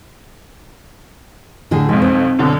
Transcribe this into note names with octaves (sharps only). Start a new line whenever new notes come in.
A2 D3 G#4
B1 F2 G#3
C4
F#2 B2 D3